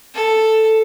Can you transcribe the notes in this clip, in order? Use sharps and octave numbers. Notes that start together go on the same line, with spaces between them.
A4